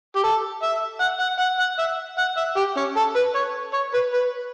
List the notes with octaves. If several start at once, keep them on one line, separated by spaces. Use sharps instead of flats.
G4
A4
E5
F#5
F#5
F#5
F#5
E5
F#5
E5
G4
C#4
A4
B4
C#5
C#5
B4
B4